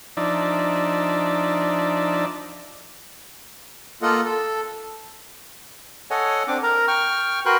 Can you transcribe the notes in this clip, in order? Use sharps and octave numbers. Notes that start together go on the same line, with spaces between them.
F3 D4 D#4 D5 E5
A#3 F4 A4 D#5 F#5
A4
A4 C#5 D#5 F#5 G#5
C4 D4 D6
A#4 A#5
G5 C#6 F6
F#4 A#4 B4 G5 C6 F#6